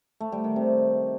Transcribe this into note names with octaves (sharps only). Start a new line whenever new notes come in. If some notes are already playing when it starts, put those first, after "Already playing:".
A3
G3
D#3
C3